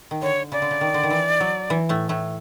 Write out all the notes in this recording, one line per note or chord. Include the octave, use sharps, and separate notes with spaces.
D#3
D3 C#5
C#3 D5
D3
C#3
D#3
D3
D#3
E3
F#3
E3
A2 A3
A2 A3